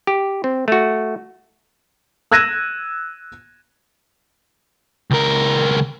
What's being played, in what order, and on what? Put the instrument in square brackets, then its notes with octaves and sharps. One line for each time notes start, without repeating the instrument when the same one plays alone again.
[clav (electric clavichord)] G4
C4
A3 F#4
[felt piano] E6 F#6 G#6 A#6 D#7 E7
[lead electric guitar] C#2 A#4